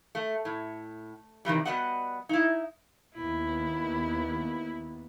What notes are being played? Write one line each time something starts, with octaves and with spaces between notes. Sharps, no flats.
A3
A2
C3 D#3 E3 G3
G3 B3 F#4 D#5 F#5
D#4 E4
D#2 B3 E4